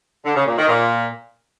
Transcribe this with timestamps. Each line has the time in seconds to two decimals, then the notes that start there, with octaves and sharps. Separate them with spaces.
0.25 D3
0.36 C#3
0.46 A#2
0.57 D#3
0.68 A#2